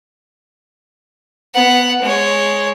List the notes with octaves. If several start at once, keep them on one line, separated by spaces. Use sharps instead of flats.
B3 F#5
G#3 C#5